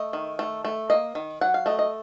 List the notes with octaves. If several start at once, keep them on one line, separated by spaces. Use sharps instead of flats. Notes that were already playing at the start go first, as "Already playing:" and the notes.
Already playing: A3 D#5
D#3
A3
A3
A#3 D#5
D#3
F#3 F#5
F5
A3 D#5
D#5